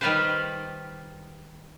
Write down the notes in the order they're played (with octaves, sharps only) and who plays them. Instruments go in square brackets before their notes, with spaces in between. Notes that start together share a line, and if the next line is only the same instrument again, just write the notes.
[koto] D#3 G3 F4 G4 B4 C5